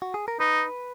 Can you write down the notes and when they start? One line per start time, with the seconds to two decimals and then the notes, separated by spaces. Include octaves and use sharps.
0.02 F#4
0.14 G#4
0.28 A#4
0.40 D#4 B4